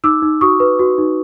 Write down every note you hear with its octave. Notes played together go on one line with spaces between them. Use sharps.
D#4 D6 E6
D#4
F#4 C#6 D#6
B4
F#4
D#4